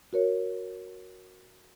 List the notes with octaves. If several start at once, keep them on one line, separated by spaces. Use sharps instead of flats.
F#4 A#4 C#5